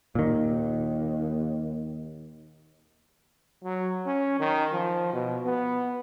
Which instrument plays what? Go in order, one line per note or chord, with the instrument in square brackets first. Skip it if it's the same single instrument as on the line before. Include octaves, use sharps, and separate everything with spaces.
[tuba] D#2 [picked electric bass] A#2 D#3
[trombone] F#3
C#4
D#3
F3
B2
B3